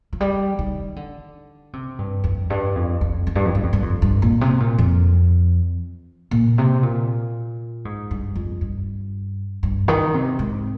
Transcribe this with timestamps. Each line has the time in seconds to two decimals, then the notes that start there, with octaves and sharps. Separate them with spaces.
0.13 F3
0.20 G3
0.59 D#3
0.96 D3
1.73 C3
1.98 G2
2.24 F2
2.50 G2
2.76 F2
3.01 F2
3.27 F2
3.35 G2
3.45 F2
3.55 G2
3.63 F2
3.73 G2
3.83 F2
4.02 G2
4.22 A#2
4.41 C3
4.60 A#2
4.78 F2
6.31 A#2
6.58 C3
6.83 A#2
7.85 G#2
8.11 G2
8.35 F2
8.61 G2
9.63 G2
9.88 D#3
10.14 C3
10.39 G#2